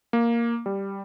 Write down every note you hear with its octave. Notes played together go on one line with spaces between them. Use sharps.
A#3
G3